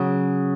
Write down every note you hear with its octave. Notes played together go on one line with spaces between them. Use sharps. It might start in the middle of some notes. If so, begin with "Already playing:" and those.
Already playing: C#3 F#3